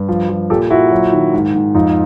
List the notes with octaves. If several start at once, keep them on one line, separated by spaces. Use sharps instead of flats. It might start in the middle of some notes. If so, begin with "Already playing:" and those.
Already playing: G2
F3
F3
A#2 G4 A4
A#2 E4 F#4
F#3
D#3
G#2
G#2
F2 D#4 F4